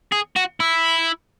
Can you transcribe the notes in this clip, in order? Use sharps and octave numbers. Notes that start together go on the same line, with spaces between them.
G#4
F#4
E4